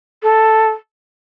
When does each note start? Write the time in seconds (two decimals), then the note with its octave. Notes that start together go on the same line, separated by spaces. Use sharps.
0.23 A4